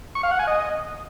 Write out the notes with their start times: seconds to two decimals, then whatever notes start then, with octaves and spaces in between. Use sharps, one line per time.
0.15 C#6
0.23 F5
0.31 F#5
0.39 G#5
0.47 D#5